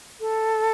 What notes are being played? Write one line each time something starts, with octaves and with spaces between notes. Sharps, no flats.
A4